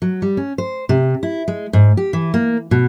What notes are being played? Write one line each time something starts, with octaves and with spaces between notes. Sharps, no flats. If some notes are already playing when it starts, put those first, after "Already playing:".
F#3
G3
C#4
C5
C3
E4
G#3
G#2
G4
E3
A#3
B2